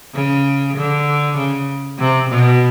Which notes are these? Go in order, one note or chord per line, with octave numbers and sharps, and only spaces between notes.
C#3
D3
C#3
C3
B2